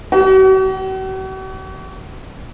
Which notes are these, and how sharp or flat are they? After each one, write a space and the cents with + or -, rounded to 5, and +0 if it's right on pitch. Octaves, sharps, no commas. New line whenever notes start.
F#4 +45